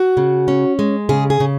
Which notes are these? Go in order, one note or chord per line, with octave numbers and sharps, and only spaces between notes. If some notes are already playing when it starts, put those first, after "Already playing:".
Already playing: F#4
C#3
C#4
G#3
C#3 G#4
G#4
C#3